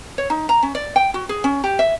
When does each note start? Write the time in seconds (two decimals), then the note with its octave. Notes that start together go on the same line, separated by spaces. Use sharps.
0.18 C#5
0.30 D#4
0.49 A#5
0.63 C#4
0.75 D5
0.96 G5
1.14 F#4
1.29 G#4
1.44 C#4
1.64 G4
1.79 E5